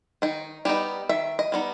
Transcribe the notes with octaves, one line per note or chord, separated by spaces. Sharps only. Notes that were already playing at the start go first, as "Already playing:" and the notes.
D#3 D#4
G3 B3 D#4 G4
D#3 E5
D#5
G3 B3 D#4